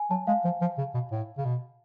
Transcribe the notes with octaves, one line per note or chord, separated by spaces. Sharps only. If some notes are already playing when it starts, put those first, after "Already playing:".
Already playing: G#5
F#3 A5
G#3 F5
F3
F3
C#3
B2
A2
C#3
B2